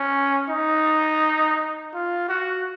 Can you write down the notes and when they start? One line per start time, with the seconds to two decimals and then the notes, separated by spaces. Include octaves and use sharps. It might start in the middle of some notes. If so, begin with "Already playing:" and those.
Already playing: C#4
0.49 D#4
1.93 F4
2.29 F#4